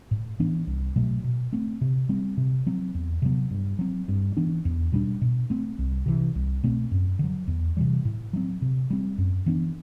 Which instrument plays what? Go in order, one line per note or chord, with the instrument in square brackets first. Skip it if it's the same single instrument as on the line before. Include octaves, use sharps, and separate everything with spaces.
[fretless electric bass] A2
E3 B3 D4
C2
B2 F#3 A3
B2
A3 C4
C3
G3 C4
C3
F#3 C4
E2
C3 F#3 B3
G2
F#3 C4
G2
E3 B3 D4
E2
B2 G3 D4
B2
A3 C4
C2
C3 E3
C2
B2 A3 C4
F#2
D3 F#3
E2
C3 E3 G3
A2
F#3 A3 C4
C3
G3 C4
F#2
E3 B3 D4